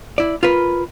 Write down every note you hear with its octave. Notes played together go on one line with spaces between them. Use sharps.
E4 D5
F4 A#4 B4